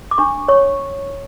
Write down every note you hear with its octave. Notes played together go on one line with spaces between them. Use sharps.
D6
D4 C#6
C#5 C#6